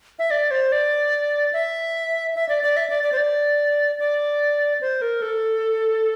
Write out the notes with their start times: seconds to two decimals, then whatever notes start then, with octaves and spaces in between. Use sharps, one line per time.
0.19 E5
0.31 D5
0.51 C5
0.72 D5
1.53 E5
2.36 E5
2.49 D5
2.63 D5
2.77 E5
2.90 D5
3.03 D5
3.12 C5
3.17 D5
3.99 D5
4.81 C5
5.02 A#4
5.22 A4